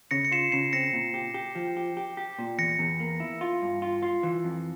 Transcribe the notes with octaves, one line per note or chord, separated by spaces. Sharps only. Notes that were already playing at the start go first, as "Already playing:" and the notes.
C#3 A#6 C#7
C#7
F4 C7 E7
C#3 C7 E7
C4 A#6 C#7
A#2
G4
G4
F3
G4
G4
G4
A#2
E2 A#6 C#7
E2
A#3
E4
F4
G2
F4
F4
E3
F2